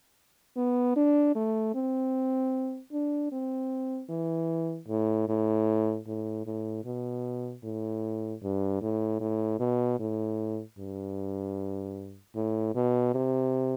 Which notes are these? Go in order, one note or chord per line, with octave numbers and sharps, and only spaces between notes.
B3
D4
A3
C4
D4
C4
E3
A2
A2
A2
A2
B2
A2
G2
A2
A2
B2
A2
G2
A2
B2
C3